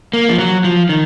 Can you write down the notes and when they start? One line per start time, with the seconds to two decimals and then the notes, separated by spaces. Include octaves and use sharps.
0.13 A#3
0.30 F3
0.39 F#3
0.64 F3
0.89 D#3